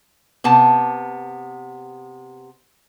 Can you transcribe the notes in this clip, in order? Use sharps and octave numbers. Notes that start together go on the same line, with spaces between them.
C3 B3 A5